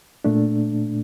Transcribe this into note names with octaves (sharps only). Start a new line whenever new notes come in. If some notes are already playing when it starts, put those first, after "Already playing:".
A#2 A3 D4